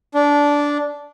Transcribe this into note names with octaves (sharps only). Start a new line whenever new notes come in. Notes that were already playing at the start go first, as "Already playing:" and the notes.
D4